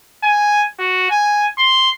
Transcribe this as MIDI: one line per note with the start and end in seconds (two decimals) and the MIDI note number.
0.24 0.67 80
0.79 1.06 66
1.10 1.47 80
1.58 1.90 84